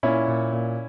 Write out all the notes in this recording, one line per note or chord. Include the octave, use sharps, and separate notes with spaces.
A#2 C#4 E4
A#2
A#2